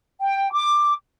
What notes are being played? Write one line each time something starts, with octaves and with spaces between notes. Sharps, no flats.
G5
D6